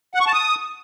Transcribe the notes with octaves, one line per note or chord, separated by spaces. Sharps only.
F#5
C#6
A5
D#6